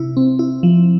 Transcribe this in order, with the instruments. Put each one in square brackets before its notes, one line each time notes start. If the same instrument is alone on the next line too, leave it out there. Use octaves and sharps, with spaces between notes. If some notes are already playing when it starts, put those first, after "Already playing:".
Already playing: [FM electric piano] C3 E4
C4
E4
F3